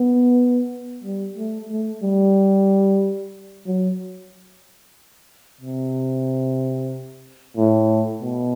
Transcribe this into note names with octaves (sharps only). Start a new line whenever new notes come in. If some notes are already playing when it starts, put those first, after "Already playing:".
Already playing: B3
G3
A3
A3
G3
F#3
C3
A2
B2